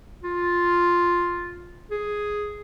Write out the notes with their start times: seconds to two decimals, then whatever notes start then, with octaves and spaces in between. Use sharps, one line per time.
0.23 F4
1.91 G#4